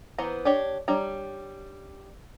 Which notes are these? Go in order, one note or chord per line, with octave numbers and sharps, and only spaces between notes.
E3 B3 C5 F#5 A#5
D4 G4 C#5
G3 D4 C#5 A#5